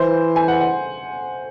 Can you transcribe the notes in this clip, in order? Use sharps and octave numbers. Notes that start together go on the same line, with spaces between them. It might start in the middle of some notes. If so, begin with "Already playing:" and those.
Already playing: E3 C5
G#5
F#5
F#5